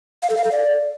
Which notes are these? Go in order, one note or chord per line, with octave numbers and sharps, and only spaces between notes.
F5
A4
F5
A4
D5